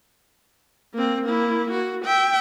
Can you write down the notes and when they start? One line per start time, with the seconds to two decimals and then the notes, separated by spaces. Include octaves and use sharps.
0.94 A#3 C4
1.24 A#3 E4
1.71 F#4
2.05 E5 G5